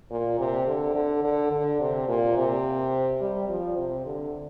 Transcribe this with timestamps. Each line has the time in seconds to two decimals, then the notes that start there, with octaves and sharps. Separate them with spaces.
0.11 A#2
0.39 C3
0.66 D3
0.95 D3
1.24 D3
1.51 D3
1.80 C3
2.08 A#2
2.37 C3
3.21 G3
3.49 F3
3.78 C3
4.06 D3